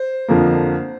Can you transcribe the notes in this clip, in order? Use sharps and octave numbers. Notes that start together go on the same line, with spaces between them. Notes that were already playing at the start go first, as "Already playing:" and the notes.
Already playing: C5
F2 D3 F3 A#3